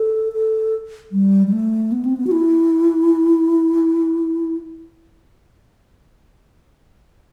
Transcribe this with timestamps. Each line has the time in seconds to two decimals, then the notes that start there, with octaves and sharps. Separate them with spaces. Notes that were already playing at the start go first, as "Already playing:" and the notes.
Already playing: A4
0.33 A4
1.12 G3
1.47 G3
1.52 A3
1.92 B3
2.05 C4
2.17 B3
2.27 F#4
2.31 E4